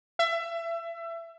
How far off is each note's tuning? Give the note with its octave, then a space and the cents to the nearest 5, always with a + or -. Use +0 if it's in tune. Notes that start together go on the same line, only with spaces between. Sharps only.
E5 +25